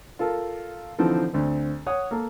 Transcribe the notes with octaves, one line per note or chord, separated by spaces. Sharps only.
F4 A4 A#4
D3 E3 F3 C4 D#4 A4
D2 C4
C#5 F#5 D#6
A#3 A4